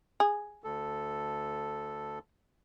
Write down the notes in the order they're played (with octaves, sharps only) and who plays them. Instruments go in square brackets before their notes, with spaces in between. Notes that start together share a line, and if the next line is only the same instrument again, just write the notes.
[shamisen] G#4
[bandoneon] D2 A4